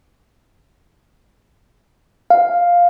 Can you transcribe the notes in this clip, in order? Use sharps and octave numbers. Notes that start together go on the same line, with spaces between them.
F5